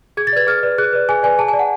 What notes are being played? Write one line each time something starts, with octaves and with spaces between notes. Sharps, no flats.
G#4 G#6
A6
B4 D5 G#6
G#4 F6
B4 D5
G#4 F#6
B4 D5
G#4 G#5
B4 D5 G#5
G#4 A5
G#5
D5
F#5